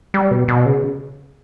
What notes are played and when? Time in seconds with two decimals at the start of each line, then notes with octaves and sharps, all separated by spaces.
0.14 G3
0.31 B2
0.48 B2
0.66 C#3